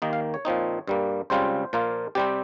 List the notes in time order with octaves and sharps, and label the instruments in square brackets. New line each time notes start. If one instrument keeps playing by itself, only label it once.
[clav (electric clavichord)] D#2 D#3 A#3 D#5
F5
C#5
A#2 F3 C4 D#4
G2 G3 A#3
C#2 C#3 G3 C4 F4 C5
A#2 F3 A#3 F4
C3 G3 C4 G4